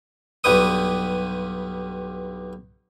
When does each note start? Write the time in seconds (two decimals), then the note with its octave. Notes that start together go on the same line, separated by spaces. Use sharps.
0.44 B1 G2 G3 B4 D#6